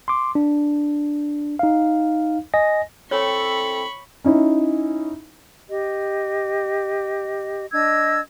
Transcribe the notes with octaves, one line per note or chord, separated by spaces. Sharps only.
C6 D6
D4
D#4 F5
D#5 G#5 A#6
C4 E4 A4 C#5 G5 B5 C#6
C#4 D#4 E4
G4 D#5
D4 D#5 E6 G#6